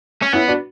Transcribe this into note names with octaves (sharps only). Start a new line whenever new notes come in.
C#4
B3 C#4 E4
D4 F#4